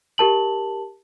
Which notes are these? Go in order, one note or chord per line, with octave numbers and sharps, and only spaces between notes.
G4 A#4 A5 F#7